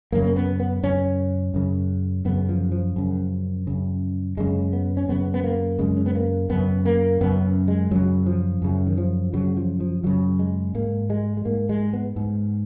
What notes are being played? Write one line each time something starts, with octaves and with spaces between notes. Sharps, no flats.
F#2 C#3 A#3
A#3
B3
B3
F#2 C#3 C#4
F#2 C#3
F#2 C#3 B3
F3
F3
F#2 C#3
F#2 C#3
F#2 C#3 G#3
B3
C#4
F#2 C#3 B3
B3
A#3
F#2 C#3 G#3
C#4
B3
A#3
F#2 C#3 B3
A#3
F#2 C#3 B3
G#3
F#2 C#3 F#3
F3
F#2 C#3
D#3
F3
F#2 C#3 F#3
F3
F3
F#2 C#3 F#3
G#3
G#2 A#3
G#3
G#3
G#2 A#3
G#3
B3
G#2